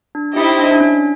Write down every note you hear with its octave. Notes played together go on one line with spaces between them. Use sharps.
D4
D#4 E4 G4 C5 D#5
D4
D4
C#4